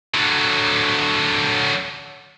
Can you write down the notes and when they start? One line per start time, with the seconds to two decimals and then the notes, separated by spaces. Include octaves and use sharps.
0.14 D3 F#3